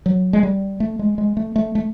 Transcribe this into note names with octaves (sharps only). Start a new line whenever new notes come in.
F#3
G#3
G3
A3
G#3
G#3
A3
A3
A3